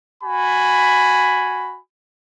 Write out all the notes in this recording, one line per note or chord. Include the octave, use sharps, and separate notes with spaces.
F#4 G#5 B5